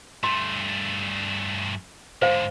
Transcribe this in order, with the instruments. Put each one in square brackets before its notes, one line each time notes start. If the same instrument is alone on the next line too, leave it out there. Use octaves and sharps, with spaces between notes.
[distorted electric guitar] G2 A3 [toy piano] C6
[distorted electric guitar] G#2 D3 [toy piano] C5 F5